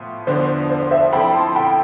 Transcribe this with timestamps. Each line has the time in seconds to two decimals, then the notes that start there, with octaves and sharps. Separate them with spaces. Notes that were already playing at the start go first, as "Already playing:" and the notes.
Already playing: A2 F3 B3 F4
0.27 E2 D3 F3 B3 D4 C5
0.70 C5
0.91 C5 E5
1.13 F3 C4 E4 A4 G5 B5
1.34 A5 C6
1.55 G5 B5